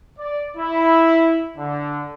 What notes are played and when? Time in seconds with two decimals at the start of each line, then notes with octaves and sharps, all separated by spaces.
0.19 D5
0.57 E4
1.57 D3